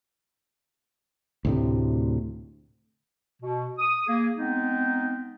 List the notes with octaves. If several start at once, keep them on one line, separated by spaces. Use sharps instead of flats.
D2 A2 C3
B2
D#6
A#3 G#4
G#3 B3 C4 D#4